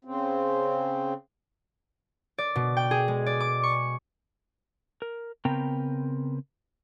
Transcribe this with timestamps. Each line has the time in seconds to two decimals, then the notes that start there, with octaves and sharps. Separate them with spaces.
0.05 C#3 C4
2.38 D5
2.56 B2
2.77 G5
2.91 G#4
3.08 G#3
3.26 D5
3.40 D6
3.63 C#6
5.02 A#4
5.45 C#3 B3 C4 A#4 G5 A#5